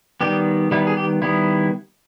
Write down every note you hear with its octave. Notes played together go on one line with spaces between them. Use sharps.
D#3 G3 B3 G4
D#3 G3 B3 E4
G#4
G4
D#3 G3 B3 E4